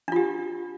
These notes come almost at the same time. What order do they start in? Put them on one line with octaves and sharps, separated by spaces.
D4 F4 G4